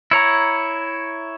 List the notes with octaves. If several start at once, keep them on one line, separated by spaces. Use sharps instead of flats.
E4 C#5 A#5